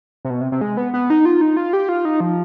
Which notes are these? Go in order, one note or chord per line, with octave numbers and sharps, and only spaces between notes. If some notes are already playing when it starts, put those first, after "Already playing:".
C3
B2
C3
C3
G#3
B3
B3
D#4
F4
D#4
F4
G4
F4
D#4
F3